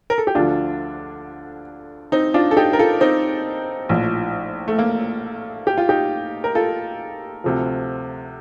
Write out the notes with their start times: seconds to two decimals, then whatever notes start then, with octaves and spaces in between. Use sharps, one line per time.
0.10 A#4
0.18 A4
0.27 G4
0.35 D2 D3 F3 D4 F4
2.12 C4 D#4
2.34 D4 F4
2.51 A4
2.57 D#4 G4
2.73 A#4
2.79 F4 A4
3.01 C4 D#4
3.89 A#1 A2 F3
4.68 A3
4.79 A#3
5.67 G4
5.78 F4
5.89 D#4 G4
6.44 A#4
6.55 F4 A4
7.44 D2 C3 F3